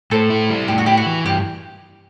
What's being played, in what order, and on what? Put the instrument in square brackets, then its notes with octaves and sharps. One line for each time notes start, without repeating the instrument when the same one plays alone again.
[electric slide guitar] A2 [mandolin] A4 C5
[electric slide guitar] E4
G3
[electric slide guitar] A2 [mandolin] G4
[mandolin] F#4
[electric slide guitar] E4 [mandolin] G4
[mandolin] F#4
[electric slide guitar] E3
[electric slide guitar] G2 [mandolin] G4